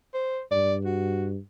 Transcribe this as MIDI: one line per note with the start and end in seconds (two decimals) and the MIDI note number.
0.14 0.40 72
0.51 1.38 43
0.51 0.74 74
0.85 1.28 66